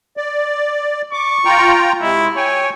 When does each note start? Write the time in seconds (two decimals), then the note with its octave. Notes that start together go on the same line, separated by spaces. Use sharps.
0.17 D5
1.13 C#6 D6
1.45 F4 G5 A#5
2.02 C3 G#3 E4
2.36 C#5 G5 G#5